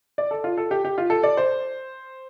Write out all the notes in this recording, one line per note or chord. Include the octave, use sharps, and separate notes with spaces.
D5
A4
F4
A4
G4
G4
F4
A4
D5
C5